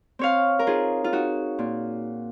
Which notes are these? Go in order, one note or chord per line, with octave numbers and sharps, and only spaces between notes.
C4 C#5 F5
A#4
D#4 F4 G#4
F4
D#4 F#4
A#2